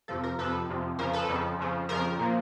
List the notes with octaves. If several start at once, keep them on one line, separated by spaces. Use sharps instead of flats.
F2 C3 F3 A4
A#4
F2 C3 F3 A4 B4
F2 C3 F3
F2 C#3 F3 A#4 C5
A4 B4
F2 C#3 F3
F2 C#3 F3
F2 C#3 F3 A#4
A#2 F3 A#3